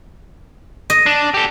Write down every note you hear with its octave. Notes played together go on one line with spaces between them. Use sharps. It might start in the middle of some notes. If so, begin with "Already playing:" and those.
D#5
D4
G4 A4